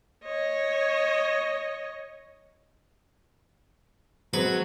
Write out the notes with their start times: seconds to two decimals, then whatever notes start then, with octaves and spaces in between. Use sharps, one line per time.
0.24 C#5 D#5
4.34 F#3 G#3 C4 B4